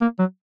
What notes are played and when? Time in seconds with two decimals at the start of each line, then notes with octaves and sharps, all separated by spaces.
0.01 A#3
0.19 F#3